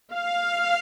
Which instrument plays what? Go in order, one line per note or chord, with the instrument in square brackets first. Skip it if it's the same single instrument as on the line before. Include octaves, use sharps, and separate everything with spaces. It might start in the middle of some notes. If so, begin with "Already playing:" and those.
[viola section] F5